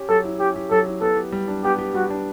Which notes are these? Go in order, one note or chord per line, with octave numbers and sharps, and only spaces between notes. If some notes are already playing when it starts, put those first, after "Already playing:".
Already playing: C#4 G4
F#3 A4
E4
C#4 G4
G4
F#3 A4
E4
B3 A4
G4
G3
D4
B3 G4
G4
G3 F#4
D4